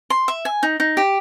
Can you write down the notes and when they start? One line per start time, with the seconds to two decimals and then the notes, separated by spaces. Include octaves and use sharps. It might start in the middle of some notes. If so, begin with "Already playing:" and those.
0.10 C6
0.28 E5
0.45 G#5
0.63 D#4
0.80 D#4
0.97 G4